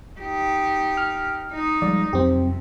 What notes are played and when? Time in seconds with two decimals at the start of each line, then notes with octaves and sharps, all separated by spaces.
0.20 D#4 G4
0.97 F6
1.53 D#4
1.82 F3 G3 G#3 D5
2.13 F2 C3 F#3 C4 G4